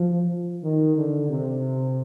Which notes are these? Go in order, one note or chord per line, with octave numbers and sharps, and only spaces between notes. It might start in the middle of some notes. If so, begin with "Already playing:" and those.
Already playing: F3
D#3
D3
C3